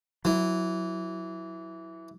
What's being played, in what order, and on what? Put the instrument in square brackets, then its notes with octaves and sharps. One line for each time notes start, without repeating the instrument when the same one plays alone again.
[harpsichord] E3 [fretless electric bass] F#3